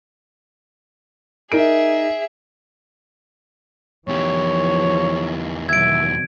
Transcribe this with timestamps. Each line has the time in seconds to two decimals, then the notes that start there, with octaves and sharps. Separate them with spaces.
1.52 D#4 G#4 A#4 E5 D7
4.08 E2 E3 F3 G4 C#5
5.69 B2 D#3 F#3 E5 G#6 D7